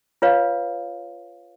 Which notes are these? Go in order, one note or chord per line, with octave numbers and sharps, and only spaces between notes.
F4 B4 C#5 F5